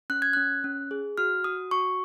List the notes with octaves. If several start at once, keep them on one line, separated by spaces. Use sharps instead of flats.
C#4 F#6
G#6
C#4 F#6
C#4
G#4
F#4 F6
F#4 D#6
F#4 C#6